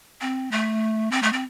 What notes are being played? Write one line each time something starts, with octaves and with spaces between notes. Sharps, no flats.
C4
A3
C4
A3
C4